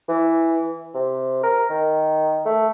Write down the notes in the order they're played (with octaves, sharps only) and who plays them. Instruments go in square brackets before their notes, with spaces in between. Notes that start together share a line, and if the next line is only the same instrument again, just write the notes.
[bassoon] E3
C3
A#4
D#3
A3